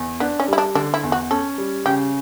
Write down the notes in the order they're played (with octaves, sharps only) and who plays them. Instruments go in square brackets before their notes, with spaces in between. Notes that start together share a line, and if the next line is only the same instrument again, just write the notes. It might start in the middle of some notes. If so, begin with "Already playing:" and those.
Already playing: [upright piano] E2
[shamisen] B3 [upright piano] D4
[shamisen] C#4
[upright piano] G3 [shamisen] E4
[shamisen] D4
[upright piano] D3 [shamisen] D4
[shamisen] E4
[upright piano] E2
[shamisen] F#4
[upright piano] C#4 [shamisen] A4
[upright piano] G3
[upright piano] C#3 [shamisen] G4